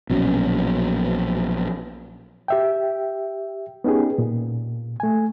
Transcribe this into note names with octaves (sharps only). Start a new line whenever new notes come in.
A#1 B2 F#3 C#4
G4 E5 G5
B3 C#4 D#4 G4 G#4
A#2
A3 G#5